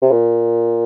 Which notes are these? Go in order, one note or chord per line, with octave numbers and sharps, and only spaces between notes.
C3
A#2